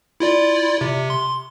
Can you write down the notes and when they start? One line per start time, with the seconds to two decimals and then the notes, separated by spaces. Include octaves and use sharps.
0.20 E4 F4 D5
0.81 C3
1.10 C6